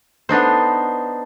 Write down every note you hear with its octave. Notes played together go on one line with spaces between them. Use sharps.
B3 D4 D#4 C5